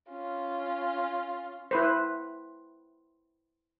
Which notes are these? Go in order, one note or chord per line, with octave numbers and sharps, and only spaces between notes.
C#4 F4
E4 B4 C5